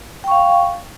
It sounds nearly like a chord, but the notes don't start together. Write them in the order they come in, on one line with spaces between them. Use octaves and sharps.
G5 C#6 F5